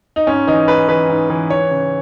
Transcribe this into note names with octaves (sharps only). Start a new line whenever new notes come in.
D#4
G#2 C#4
E3 D#4
G#2 B4
E3 B4
G#2
E3
E3 C#5
C#3